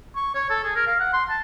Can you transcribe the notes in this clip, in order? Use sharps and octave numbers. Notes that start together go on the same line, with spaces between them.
C#6
C#5
A4
G#4
A#4
F5
F#5
C6
A5